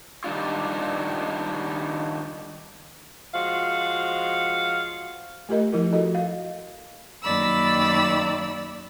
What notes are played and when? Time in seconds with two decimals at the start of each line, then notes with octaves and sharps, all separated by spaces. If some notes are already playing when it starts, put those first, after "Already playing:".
0.24 D#3 G3 D4 F4
3.35 F3 G#3 F#4 F5
5.49 A3 F4 G4 A#4 D#5
5.72 F3 E4 F4 A#4
5.93 F#4 A4 D#5
6.15 F5
7.23 F#2 D#3 A#3 D5 B5 E6